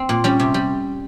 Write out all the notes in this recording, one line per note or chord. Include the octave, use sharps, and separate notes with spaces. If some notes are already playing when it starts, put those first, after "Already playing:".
Already playing: C4
A#2
G3 C#4
C3
G3